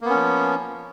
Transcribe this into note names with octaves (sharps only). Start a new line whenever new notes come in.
F3 A#3 B3 C#4